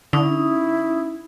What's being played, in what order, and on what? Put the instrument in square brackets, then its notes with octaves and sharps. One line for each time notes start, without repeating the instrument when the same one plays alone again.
[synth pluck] D3 [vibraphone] C#4 D#4 D#6 [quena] E4